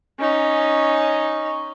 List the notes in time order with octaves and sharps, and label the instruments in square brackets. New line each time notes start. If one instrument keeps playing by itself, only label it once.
[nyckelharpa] C#4 D#4